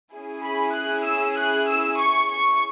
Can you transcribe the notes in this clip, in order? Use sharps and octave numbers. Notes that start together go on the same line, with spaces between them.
C#4 E4 G#4
B5
F#6
E6
F#6
E6
C#6
C#6